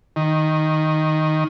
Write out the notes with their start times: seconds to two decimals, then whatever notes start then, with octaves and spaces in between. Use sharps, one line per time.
0.16 D#3